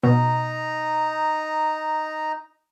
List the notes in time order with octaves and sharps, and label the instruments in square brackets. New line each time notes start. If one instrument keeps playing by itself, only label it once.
[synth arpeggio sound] B2 [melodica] D#4 A#5